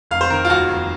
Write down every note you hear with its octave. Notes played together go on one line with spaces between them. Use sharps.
F1 F5
C5
D#3 A#4
F4
D#2 F#4
F1